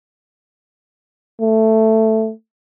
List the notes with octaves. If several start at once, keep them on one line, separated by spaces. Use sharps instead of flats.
A3